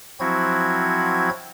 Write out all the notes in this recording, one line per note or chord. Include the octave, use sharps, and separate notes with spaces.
F3 F#3 C4 E4 F#4 G#6